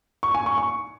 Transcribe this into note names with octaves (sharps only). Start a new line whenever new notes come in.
C#6
G#5
C#6
C#6